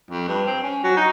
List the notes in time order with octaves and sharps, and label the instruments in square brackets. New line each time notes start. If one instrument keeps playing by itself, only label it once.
[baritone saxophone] F2
G2
C4
C#4
F#3
D#4